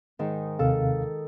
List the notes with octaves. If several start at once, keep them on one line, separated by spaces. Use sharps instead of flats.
G#2 D#3
D#2 C3 A4 F5